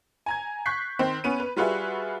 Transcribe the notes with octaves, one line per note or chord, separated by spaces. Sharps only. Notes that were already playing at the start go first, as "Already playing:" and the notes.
G#5 A#5 G#6
C#6 F#6 G6 B6 C7
D#3 C4 C5
B3 C#4 B4 D#7
B4
G3 F4 F#4 G#4 B4 E5